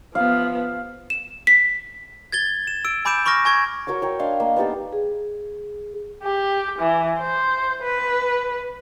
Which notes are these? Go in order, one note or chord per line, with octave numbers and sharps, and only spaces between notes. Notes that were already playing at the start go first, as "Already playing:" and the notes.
F3 B3 F5
E7
B6
G#6 A6 G7
E7
E6 D7
G#5 B5 D6 G6 D7 E7
B5 C#6 D6 F6 A#6
G#5 C#6 G#6
F#4 A#4 C#5 D6
A#4 C#5 G5
D4 D#5 F5 C6
A#3
B3 D#4 G4 A4
G#4
G4
E3
C5
B4